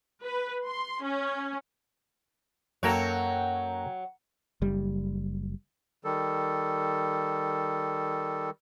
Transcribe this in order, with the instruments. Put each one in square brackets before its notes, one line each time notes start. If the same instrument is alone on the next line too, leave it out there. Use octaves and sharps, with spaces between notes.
[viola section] B4
C6
C#4
[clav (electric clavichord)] F#2 A#3 A4 [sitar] F#3 C#5 [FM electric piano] F#5 G5 A#5
[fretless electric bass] F#1 G3
[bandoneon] D#3 G3 A4